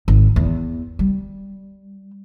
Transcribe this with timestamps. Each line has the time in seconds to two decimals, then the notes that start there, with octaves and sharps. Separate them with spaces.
0.08 G#1
0.36 E2
0.99 G3